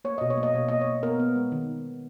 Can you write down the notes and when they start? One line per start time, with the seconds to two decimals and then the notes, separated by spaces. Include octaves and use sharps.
0.05 A#3 C#5
0.18 B2 D#5
0.30 C#5
0.38 A#3
0.43 D#5
0.54 B2 C#5
0.69 A#3 D#5
0.81 C#5
0.87 A#3
1.03 B3 A#4
1.20 B3
1.35 G#3
1.52 D#3